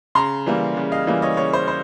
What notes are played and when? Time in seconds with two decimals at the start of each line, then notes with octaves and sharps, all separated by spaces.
0.15 C#3 A#5 C6
0.46 E3 G3 A#3
0.77 C#3
0.92 D#5 F5
1.07 E3 G3 A#3
1.22 C#5 D#5
1.37 C#3 C#5
1.53 C5
1.68 C5